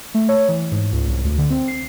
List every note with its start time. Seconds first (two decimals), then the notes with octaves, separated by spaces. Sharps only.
0.14 A3
0.29 C#5
0.49 E3
0.72 G#2
0.93 C#2
1.08 C2
1.25 D2
1.38 D3
1.50 C4
1.68 C7